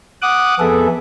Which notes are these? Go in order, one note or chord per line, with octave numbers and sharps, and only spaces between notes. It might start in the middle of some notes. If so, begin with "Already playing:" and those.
F#5 D6 D#6 F#6
F2 B3 G#4 A4 E5